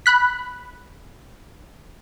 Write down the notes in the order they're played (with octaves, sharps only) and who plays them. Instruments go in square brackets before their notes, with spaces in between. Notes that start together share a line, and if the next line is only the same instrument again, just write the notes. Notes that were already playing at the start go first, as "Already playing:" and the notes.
[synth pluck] B5 F#6 B6